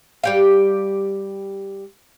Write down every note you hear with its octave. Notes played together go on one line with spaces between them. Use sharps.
G3 G4 F5